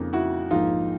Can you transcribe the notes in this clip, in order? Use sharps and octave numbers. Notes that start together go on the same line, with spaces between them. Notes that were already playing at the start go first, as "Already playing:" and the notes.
Already playing: F2 C#3 F3 A#3 D#4
E4 F#4
A#1 G#2 F3 A#3 D#4 F4